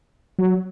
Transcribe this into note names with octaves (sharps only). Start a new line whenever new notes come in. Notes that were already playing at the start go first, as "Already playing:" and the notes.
F#3